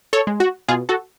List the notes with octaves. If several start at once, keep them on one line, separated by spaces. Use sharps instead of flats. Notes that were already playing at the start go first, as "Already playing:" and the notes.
A4 C#5
G#3
F#4
B2 F4 G#4
F#4 A4